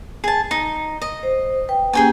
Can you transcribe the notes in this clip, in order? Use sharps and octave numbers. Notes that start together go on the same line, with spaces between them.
G#4 A5
D#4
D#5
C5
B4 G5
A#3 C#4 G4 G#4 G5 G#5